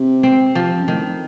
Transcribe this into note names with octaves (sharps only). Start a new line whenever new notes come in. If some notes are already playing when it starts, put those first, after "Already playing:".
Already playing: C3
C4
F3
F#2
A2 D#3